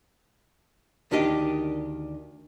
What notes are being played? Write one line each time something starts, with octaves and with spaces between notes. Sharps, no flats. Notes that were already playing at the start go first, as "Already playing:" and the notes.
D2 D#3 D4 G4 D#5